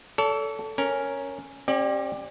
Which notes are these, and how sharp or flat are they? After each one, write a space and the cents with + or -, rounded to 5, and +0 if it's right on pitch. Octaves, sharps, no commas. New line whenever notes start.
A4 +0 C#5 +45
C#4 +0 A#4 +0
C#4 -40 G4 +0 D5 +20